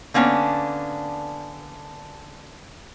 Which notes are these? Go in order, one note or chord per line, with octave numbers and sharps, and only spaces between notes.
D3 A#3 B3 C#4 D4